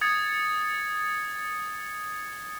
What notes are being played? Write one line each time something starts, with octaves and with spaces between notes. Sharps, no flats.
D#6 G#6 A6 C#7